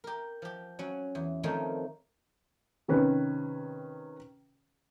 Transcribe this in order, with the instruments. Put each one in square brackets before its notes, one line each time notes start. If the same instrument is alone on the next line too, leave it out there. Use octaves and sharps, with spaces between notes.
[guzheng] G4 A#4
F3 G4
F#3 C#4 F#5
E2
D#3 F3 A3 C4 D#4 C#5
[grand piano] C3 D#3 C#4 B4